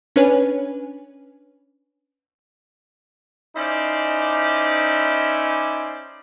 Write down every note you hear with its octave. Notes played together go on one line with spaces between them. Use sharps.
C#4 D4 B4 C#5 G#5
C#4 D#4 E4 C5 D5